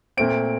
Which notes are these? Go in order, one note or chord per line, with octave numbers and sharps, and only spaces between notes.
A#2 A3 C4 D7